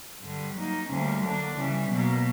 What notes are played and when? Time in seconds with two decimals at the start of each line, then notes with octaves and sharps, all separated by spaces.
0.21 G2 D3 G3
0.55 F#3 A#3 D#4
0.89 D2 D3 G3 A#3 C#4
1.23 D3 F#3 A#3 D4
1.57 C#3 E3 G3
1.90 B2 F#3 A#3